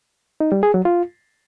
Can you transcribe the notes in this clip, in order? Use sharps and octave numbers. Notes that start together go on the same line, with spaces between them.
D#4
G3
G#4
F#3
F4